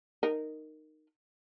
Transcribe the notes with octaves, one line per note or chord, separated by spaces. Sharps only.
D#4 A#4